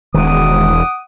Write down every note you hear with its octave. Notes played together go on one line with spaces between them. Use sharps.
E1 D#3 G#3 F#5 D6 D#6